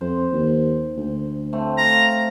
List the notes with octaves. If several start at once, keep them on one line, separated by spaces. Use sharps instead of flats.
F2 C5
D#2
D2
A2 A3 C4
F4 A#5